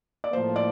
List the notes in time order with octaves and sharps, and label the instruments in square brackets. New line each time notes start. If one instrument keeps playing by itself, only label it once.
[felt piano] D5
[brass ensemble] A2 F3 A#3 [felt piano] C5
[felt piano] D5